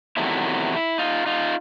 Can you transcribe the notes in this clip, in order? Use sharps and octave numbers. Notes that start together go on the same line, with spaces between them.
E2 C3 D#3 F#3 A3 E4
D#4 F4
D#4 F4